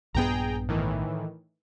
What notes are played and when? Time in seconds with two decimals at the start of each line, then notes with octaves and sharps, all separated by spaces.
0.14 A#1 G2 B3 G#4 G5 A#5
0.68 A2 D#3 E3